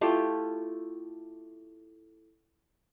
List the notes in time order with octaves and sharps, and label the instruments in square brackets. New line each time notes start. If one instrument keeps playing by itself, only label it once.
[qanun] A3 E4 F4 G4